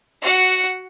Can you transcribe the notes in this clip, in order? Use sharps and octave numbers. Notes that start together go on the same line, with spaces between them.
F#4 F#5